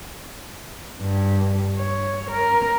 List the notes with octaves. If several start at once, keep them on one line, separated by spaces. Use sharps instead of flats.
G2
C#5
A#4